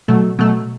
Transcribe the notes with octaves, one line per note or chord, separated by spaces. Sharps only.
B2 F#3 A3
B2 F#3 A3